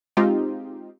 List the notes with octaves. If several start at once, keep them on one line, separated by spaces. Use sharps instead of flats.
G#3 C4 D#4 F4 G4